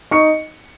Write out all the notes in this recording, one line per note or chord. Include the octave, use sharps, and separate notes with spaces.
D#4 C#6 C#7